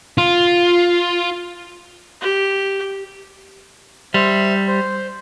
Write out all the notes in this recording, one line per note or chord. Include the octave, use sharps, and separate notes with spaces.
F4
G4
G3 C5 E5 C6
C5